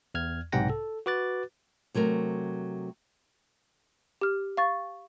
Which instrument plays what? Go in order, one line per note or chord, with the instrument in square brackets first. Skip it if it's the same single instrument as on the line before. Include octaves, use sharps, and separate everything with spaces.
[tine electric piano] E2 F6 G#6
B1 G#2 C3 F#5 G5 A#6
A4
F#4 B4 D6 F#6 A6
[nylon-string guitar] C3 F#3 A3 A#4
[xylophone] G4 F6
F5 C#6 A6